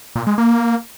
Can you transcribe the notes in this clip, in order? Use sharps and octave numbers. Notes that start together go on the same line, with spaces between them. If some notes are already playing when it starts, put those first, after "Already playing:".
A#2
G#3
A#3